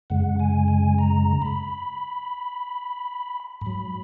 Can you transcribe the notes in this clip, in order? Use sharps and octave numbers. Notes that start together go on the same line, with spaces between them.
F#2 C#3 G#3 F#5
G#5
G#5
A#5
B5
G#2 F#3 B5